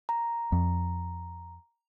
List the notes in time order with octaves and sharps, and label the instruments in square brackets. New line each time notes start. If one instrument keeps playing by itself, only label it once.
[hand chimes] A#5
[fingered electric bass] F2